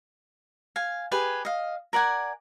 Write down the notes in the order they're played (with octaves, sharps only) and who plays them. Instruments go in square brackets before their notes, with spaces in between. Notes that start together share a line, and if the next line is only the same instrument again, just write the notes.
[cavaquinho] F5 G#5
G4 G#4 B4 G#5
D#5 F5
A#4 D5 F#5 G#5